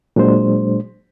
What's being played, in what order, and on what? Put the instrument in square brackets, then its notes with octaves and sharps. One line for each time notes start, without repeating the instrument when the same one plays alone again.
[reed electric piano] A#2 F#3 G#3 D4 C5